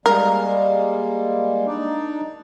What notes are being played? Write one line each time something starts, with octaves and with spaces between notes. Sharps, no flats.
G3 G#3 A#3 A#4
D4 D#4 D5